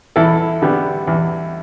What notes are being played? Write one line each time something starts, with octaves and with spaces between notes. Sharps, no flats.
E2 E4 A4
D3 G3 B3
E2